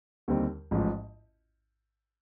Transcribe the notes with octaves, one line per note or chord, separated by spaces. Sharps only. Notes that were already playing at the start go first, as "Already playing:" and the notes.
D#2 D3 G3 C4 D#4
A1 G#2 F3